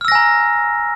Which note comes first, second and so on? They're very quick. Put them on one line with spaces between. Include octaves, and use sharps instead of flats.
F6 E6 A#6 G#5 A#5